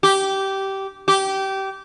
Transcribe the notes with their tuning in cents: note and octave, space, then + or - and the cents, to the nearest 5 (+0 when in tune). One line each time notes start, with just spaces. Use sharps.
G4 -15
G4 -20